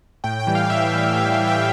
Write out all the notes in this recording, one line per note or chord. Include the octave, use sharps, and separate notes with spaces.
A2 G5
G5
E3 G3
F5
A2 E5
E3 G3
A2 F5
F5
E3 G3
G5